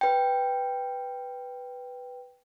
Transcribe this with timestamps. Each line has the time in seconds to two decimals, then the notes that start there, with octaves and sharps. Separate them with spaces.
0.01 B4 G5